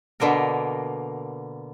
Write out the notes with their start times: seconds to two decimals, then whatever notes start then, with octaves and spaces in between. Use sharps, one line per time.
0.20 B2 D3 A#3 A#4